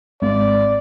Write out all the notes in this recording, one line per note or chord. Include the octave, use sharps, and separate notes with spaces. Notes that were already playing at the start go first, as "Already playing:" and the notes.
G#1 D5